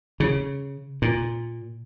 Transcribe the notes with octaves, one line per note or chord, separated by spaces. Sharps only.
C#3
A#2